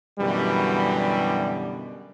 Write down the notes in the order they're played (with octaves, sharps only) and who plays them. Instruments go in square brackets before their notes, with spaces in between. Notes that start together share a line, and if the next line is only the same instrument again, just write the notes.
[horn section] F#2 B2 D3 E3 G3